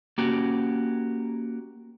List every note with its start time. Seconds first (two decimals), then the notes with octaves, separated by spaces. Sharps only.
0.18 A#3 C#4 F#4 G4